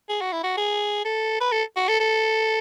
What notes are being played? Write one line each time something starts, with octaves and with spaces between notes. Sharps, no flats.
G#4
F#4
E4
F#4
G#4
A4
B4
A4
F#4
A4
A4